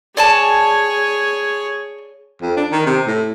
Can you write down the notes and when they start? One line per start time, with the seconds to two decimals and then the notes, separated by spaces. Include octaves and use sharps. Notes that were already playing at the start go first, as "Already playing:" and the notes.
0.17 G#4 C#5 D5 G#5 A5
2.42 F2
2.57 D4
2.72 D#3
2.86 C3
3.07 A2